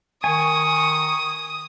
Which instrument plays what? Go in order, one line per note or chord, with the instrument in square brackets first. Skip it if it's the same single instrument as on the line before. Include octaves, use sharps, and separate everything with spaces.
[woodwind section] D#3 C#6 [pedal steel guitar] G#5 [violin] D#6